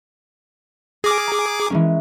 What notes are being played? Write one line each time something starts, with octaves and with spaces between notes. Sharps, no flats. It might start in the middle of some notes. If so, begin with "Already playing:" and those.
G#4 D6 F6 A#6
A#5
E3 G#3 C#4